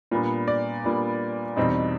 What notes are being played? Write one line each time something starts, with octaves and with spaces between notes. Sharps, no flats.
A#2 G3 B3 D4
D5
A#2 G3 B3 D4
E2 B2 G3 C4 D#4